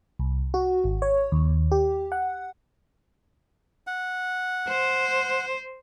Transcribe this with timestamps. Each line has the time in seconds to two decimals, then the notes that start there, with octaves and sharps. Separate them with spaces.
0.19 C2
0.54 F#4
0.84 G#1
1.02 C#5
1.32 D#2
1.72 G4
2.12 F#5
3.87 F#5
4.68 C5